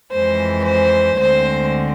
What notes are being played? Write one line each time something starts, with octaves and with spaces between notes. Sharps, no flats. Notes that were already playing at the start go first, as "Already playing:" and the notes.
F2 E3 G#3 C5
C5
D2 D3 G#3 C4 C5